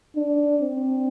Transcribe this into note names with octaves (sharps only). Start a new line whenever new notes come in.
D4
C4